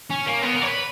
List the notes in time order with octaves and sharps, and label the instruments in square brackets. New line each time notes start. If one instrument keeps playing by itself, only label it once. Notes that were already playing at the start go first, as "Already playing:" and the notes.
[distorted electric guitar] C#4
A#3
B3
A#4
C#5
B4